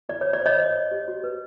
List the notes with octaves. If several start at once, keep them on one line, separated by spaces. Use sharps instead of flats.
E4 D5
C5 C#5
D5
C5 C#5 D#5
C5
C5
G4
F#4
B4